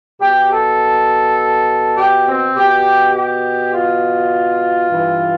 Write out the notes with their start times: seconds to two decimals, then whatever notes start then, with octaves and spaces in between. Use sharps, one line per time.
0.21 B2 G4
0.50 A4
1.97 G4
2.26 C4
2.55 B2 G4
3.13 G4
3.72 F4
4.89 G2 E3